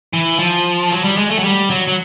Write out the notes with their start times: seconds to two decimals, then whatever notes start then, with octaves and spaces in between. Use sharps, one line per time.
0.13 E3
0.39 F3
0.91 F#3
1.04 G3
1.17 G#3
1.31 A3
1.39 F#3
1.44 G3
1.70 F#3
1.88 F#3